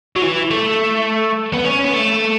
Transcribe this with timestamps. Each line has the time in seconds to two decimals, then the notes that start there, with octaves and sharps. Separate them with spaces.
0.16 F#3
0.22 E3
0.51 A3
1.53 B3
1.64 C#4
1.84 B3
1.93 A3